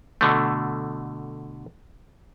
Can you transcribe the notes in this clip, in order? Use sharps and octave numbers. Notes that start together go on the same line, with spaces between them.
B2 D3 A3